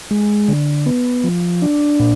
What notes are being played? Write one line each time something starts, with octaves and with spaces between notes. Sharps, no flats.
G#3
D3
B3
F3
D4
A#2